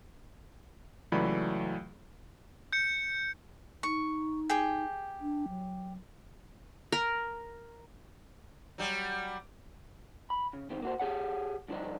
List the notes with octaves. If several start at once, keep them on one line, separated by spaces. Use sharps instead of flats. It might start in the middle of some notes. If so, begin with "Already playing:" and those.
C#2 E3 F#3 A3 D5 B5
G6 C#7
D#4 C#6
G4 G#4 G5
D4
F#3
A#4
F#3 G3
B5
C#3
E2 D#3 C4
A#3 F#4 C5
G4 G#4 C#5 F#5
G2 D3 F3 D4 D#4